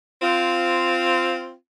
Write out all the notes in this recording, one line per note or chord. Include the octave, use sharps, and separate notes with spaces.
C4 F4